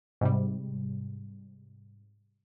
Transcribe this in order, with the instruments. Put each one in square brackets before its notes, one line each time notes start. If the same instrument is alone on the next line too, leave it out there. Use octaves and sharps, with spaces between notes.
[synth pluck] G#2 C3 G3